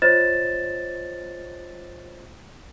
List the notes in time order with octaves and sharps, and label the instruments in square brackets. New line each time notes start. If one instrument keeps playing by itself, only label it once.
[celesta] F4 C5 C#5 D#5 A6 E7